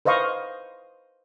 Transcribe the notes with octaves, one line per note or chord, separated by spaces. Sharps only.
B4 C5 D#5 F5 C#6